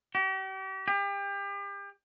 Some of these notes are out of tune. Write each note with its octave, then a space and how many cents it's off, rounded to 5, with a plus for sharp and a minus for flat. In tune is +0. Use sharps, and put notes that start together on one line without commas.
G4 -40
G4 +35